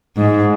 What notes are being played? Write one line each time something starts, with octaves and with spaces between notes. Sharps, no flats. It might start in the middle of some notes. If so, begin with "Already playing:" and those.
G#2